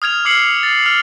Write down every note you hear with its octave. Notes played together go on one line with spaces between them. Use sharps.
D#6 F6 G#6 F7
D6 E6 F6 C7 C#7 F#7
A6
F6 F7